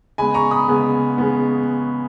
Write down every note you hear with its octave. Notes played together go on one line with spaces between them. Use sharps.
C#3 G#3 B3 G#5 B5
A#5 C#6
B5 D#6
C#3 G#3 B3
C#3 G#3 B3